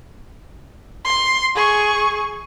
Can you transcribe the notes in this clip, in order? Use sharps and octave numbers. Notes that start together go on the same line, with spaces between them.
C6
G#4 C#6